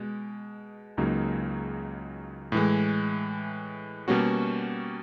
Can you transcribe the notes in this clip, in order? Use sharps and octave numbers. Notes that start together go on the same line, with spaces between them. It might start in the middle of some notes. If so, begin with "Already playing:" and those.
Already playing: B2 G#3
C#2 C#3 F#3 A#3 D#4
A2 E3 G#3
B2 G3 A#3 C#4 F#4